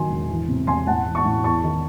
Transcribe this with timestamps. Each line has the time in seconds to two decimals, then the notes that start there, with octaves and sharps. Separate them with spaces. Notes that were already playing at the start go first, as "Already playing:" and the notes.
Already playing: D#3 F#3 G#5 C6
0.10 E1
0.30 E3
0.48 C3
0.67 E1 G#5 C6
0.87 A1 F#5 A5
1.06 E3
1.15 A5 C#6
1.25 A1
1.44 E2 A5 C#6
1.63 D#3